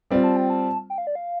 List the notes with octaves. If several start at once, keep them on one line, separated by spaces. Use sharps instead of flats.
G3 C4 F4
A5
G5
A5
G5
F5
D5
F5